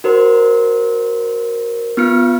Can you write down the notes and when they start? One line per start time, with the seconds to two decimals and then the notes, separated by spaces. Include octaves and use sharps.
0.04 F#4 A#4 C5
1.97 B3 F4 F6 C#7